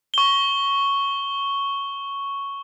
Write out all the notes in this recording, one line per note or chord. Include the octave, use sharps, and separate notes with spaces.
C#6 G7